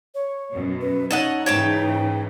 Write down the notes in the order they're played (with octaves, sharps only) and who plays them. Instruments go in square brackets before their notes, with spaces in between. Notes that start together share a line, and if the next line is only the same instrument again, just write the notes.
[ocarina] C#5
[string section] F#2 B2
[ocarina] B4
[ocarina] D#4 [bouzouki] A4 D#5 F#5 [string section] C#5
[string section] G#2 C#3 E3 [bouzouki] C#5 G5 A5